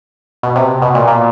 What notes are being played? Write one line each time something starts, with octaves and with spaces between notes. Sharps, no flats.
B2
C3
B2
A#2
A#2